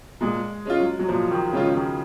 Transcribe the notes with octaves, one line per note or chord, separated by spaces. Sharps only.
A#2 G#3
G#3 C#4 F4
F#3
F#3
A#2 F3
D#3
C#3 G#3 C#4 F4
D#3